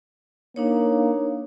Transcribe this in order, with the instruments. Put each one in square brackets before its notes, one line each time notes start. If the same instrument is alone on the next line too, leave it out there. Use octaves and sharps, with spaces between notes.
[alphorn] A#3 [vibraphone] D4 D#4 C#5